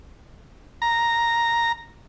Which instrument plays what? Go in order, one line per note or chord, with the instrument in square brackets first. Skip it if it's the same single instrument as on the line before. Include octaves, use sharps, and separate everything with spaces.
[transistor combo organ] A#5